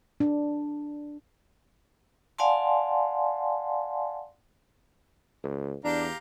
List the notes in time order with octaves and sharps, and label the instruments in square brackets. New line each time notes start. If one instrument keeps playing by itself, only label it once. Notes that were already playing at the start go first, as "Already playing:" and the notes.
[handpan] D4
[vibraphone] D5 F5 F#5 G#5 A5 C6
[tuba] C#2
[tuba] E2 [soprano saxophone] D4 [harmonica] G4 F5 A#5